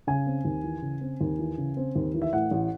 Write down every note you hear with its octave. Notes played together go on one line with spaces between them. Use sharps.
C#3 G#5
C4
D#2
E3
C#3
C4
D#2
E3
C#3
C4
D#2
E3
E5
A2 F#5
A1